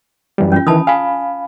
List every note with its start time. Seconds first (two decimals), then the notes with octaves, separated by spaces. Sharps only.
0.38 F#2 E3 G3
0.52 C#4 F4
0.67 D#3 E3 A5 B5 D#6
0.87 F5 G#5 B5